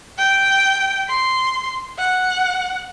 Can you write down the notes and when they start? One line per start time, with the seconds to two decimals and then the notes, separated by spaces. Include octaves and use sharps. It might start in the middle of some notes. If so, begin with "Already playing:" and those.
0.19 G5
1.08 C6
1.99 F#5